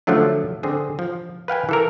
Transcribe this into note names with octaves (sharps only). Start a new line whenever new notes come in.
D3 F3 F#3 A3 D4
D3 C4 G#4
F3
B4 F5 G5 G#5
E3 A4 A#4